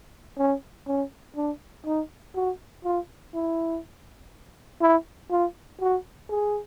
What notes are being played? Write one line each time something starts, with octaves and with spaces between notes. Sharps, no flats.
C#4
C#4
D4
D#4
F#4
F4
E4
E4
F4
F#4
G#4